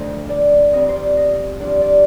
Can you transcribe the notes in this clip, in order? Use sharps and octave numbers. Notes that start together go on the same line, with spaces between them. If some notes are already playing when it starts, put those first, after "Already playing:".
Already playing: D2 D3 F3 C5 D#5
D5
F2 C3 F3 D#5
D5
C5
D5
D#5
G2 F3 D5
D5